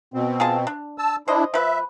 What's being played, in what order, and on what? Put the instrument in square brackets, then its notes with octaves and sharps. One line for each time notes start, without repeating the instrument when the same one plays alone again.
[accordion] B2 C4
[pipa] F4 G#4 A5
D4
[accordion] A5 E6
[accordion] D4 E4 [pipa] C5 D#5
[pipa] F3 B4 [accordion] E5